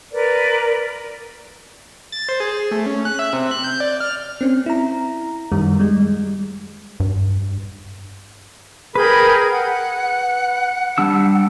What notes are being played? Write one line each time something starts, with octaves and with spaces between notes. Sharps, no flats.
A#4 B4 D5
A6
C5
G#4
A3
C#4
F#6
E5
C3
F#6
G6
D5
F6
C4 C#4
E4 A#5
F#2 D#3 G3
G3 G#3
G2
G#4 A#4 B4 G5 B5
F#5
G3 D4 E6